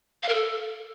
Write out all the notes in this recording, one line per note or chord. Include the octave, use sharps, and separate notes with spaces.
F5
A#4
A4